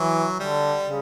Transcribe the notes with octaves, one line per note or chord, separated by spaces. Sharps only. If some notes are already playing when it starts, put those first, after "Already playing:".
Already playing: E3 F#3
D3 G3
C#3